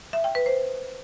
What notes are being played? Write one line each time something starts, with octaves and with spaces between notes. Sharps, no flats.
E5
G5
B4
C5